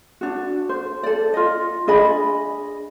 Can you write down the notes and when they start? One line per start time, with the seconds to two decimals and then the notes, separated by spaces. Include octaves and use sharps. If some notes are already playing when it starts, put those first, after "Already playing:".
0.21 D4 F#4
0.69 C5
1.03 A4 D5
1.34 F4 D#5
1.87 D4 G#4 D#5 B5